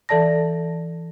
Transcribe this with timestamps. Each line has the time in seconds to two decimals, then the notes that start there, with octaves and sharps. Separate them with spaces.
0.09 E3 A4 D5 A5 A#6